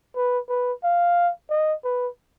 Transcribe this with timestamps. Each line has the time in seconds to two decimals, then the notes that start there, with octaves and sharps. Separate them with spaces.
0.16 B4
0.49 B4
0.84 F5
1.50 D#5
1.84 B4